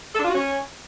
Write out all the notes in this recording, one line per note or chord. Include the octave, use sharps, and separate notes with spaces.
A4
D4
F4
F#4
C#4